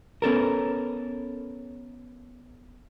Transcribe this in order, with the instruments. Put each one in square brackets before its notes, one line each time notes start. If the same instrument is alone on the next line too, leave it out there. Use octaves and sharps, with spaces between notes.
[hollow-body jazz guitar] B3 C#4 A4 A#4